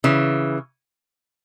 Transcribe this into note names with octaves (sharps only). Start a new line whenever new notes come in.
C#3 E3